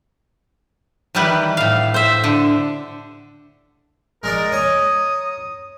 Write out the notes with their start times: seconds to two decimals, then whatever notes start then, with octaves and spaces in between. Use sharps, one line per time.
1.15 D#3 E3 G3 G4 B4
1.57 A2 F5
1.94 C5 E5
2.24 D3
4.23 G#3 D#4 A#4 D5
4.52 C#5 A#5 D#6